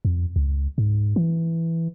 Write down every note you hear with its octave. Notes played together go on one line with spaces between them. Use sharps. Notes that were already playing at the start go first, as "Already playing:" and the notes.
F2
C#2
G#2
E3